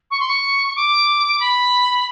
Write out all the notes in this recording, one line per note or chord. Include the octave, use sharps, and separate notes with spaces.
C#6
C6
C#6
C#6
D6
B5